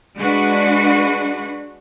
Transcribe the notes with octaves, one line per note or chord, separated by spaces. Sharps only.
G#3 D4 F#4 B4